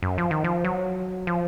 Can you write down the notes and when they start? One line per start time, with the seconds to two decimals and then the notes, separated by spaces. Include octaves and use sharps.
0.03 F#2
0.18 F3
0.31 D#3
0.44 F3
0.64 F#3
1.27 F3